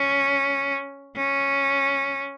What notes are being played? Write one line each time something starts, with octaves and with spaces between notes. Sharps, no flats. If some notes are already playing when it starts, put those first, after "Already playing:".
Already playing: C#4
C#4